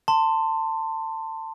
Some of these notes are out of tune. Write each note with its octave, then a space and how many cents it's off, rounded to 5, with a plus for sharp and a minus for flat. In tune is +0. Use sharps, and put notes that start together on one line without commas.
A5 +20 C6 +0